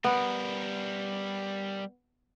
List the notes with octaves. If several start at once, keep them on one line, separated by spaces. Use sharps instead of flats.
G3 B3 A#4